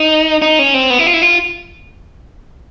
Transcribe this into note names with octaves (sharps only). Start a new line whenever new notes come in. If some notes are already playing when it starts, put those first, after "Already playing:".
Already playing: D#4
D#4
C#4
C4
B3
E4
F4
E4
F4